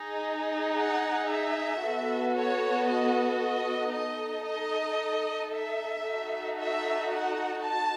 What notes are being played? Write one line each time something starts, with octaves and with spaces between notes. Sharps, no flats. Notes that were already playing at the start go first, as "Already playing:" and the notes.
Already playing: D#4 G#4
F#5
E5
B3 F#4 A4
C#5
D#5
D#5
D#4 A4 D#5
D#5
E5
D#4 F#4 A4
E5
F#5
A5